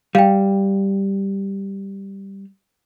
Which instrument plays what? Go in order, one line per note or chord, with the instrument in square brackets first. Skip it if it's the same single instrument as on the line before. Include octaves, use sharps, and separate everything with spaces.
[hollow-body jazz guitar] G3 [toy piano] F5 G5